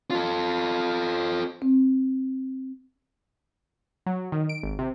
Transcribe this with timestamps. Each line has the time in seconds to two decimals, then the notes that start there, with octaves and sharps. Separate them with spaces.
0.11 F4 A4
1.62 C4
4.06 F#3
4.32 D#3
4.49 D7
4.63 G#1
4.79 C3